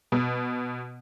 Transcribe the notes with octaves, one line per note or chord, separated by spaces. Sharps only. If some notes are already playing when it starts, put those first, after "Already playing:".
B2